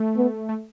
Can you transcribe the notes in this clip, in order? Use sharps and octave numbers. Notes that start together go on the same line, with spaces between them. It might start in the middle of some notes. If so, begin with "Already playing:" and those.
Already playing: A3
B3
A3